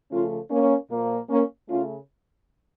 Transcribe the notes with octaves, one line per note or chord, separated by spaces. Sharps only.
C#3 F3 A3 C#4 F4
A#3 C#4
A#2 F3 A#3
A#3 C#4
C#3 A3 C#4 F4